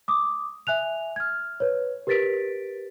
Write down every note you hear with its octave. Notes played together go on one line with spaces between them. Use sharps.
D6 D#6
E5 G#5 F#6 F7
F6 G#6
B4 C#5
G4 A#4 B4 A6 B6 D7